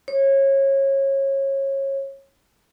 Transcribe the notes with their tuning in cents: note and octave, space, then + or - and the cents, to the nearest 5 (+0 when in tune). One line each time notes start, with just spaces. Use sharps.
C#5 -25